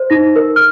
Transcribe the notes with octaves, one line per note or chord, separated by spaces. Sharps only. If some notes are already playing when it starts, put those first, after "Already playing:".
Already playing: C5
D#4 A#6
A#4
F6